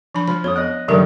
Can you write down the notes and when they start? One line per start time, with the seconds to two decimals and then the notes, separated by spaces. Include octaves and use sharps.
0.15 F3 D4 B5
0.28 F3 B5
0.44 F2 C#5 D#6
0.56 B3 D#5 F#6
0.88 G2 D3 D#3 F#3 A3 A#4